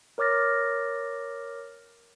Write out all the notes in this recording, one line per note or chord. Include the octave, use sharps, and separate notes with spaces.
A#4 C#5 D6 F6 A6 A#6